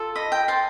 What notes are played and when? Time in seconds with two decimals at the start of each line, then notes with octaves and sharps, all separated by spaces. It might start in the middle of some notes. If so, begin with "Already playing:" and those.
Already playing: F4 A4
0.15 D#5 B5
0.32 G5
0.48 C5 A5